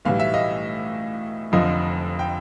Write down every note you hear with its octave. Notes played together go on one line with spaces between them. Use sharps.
B1 A2 E3 G3 F5
E5
D#5 F5
F1 F2 D3 F3 D#5 F5
G5